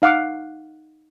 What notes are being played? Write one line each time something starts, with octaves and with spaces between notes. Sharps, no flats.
D#4 F5 F#5 D6